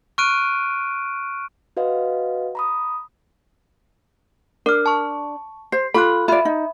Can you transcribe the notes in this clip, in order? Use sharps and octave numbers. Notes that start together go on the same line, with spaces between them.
C#6 F6 F#6 D7 D#7
F#4 B4 D#5 F5 F#5
A#5 B5 D#6
D4 A#4 F6
A5 C#6
C5 C7
F4 A4 B5 F#6
F4 D5 E5 B5
D#4